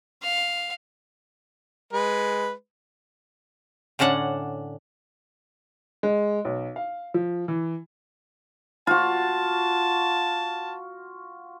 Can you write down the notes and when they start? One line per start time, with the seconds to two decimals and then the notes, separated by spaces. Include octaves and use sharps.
0.23 F5
1.93 G#3 B4
3.99 A2 D3 C#4 D4 F#5
6.03 G#3
6.45 B1
6.76 F5
7.14 F3
7.48 E3
8.87 F4 F#4 A5